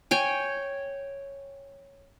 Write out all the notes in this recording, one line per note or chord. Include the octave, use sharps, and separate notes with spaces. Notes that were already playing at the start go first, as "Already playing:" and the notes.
C#5 G5 G#5